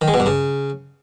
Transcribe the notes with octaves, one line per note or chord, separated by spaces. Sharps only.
D#3
G#3
B2
G2
C#3